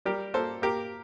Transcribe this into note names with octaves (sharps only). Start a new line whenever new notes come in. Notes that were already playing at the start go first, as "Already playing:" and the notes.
G3 G4 A#4
A#3 A4 C5
A#3 G4 A#4